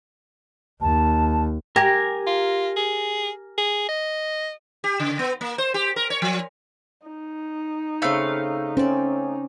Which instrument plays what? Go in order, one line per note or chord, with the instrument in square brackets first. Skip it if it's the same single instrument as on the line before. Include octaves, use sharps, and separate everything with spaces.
[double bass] D#2 [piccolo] A5
[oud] G4 [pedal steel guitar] A#4 G#5 A#5
[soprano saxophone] F4
G#4
G#4
D#5
[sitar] G4
C#3
B3
A#3
C5
G4
A#4
C#5
F3
[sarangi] D#4
[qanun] C#3 C4 B5 [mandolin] A3 F5
[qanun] C4 D5 [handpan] C#4